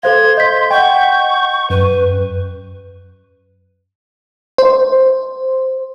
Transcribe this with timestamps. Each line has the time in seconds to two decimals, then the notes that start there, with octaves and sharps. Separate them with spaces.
0.03 A4 C5 F5 C6 G#6
0.37 D#5 G6 B6
0.71 D#5 F#5 G5 C#6
1.70 F#2 B4
4.58 C5